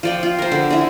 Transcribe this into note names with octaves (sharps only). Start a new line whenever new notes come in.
F3 D5 G5
F4
A#4 C5
D3
E4 G#4